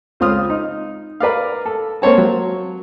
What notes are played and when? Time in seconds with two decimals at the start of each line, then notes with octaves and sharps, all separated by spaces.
0.20 C#2 C4 F4 C6 D#6 F6
0.50 D#4
1.20 A#4 B4 D5 F5
1.65 A4
2.02 A#3 C4 C5 C#5 A5
2.18 F#3